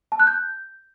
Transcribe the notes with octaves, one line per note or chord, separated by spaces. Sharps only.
A5
F#6
G6